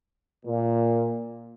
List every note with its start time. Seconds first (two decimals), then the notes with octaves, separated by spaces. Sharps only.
0.46 A#2